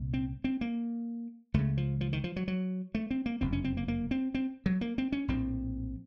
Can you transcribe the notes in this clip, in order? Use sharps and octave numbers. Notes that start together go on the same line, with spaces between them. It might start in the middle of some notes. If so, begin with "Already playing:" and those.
Already playing: C2 A#2
C4
C4
A#3
C#2 C#3 A3
F3
F3
D#3
F3
F#3
F#3
A3
C4
A#3
F#1 F2 C3 C4
C#4
C4
A#3
A#3
C4
C4
F#3
A#3
C4
C#4
A#1 A2 C4